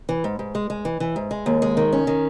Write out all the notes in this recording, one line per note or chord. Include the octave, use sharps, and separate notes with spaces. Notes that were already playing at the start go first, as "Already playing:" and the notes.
E3
G#2
G#2
G#3
G#3
E3
E3
G#2
G#3
D#2
G#3
D#3
C#4
D#3